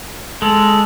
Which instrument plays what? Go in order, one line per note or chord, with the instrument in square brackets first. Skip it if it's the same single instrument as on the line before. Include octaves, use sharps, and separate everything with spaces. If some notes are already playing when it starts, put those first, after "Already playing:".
[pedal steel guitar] G#3 [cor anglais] A4